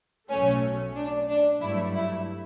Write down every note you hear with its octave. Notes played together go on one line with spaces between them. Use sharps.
B1 A2 F#3 A3 C#4
D4
D4
G2 F#3 A3 E4
E4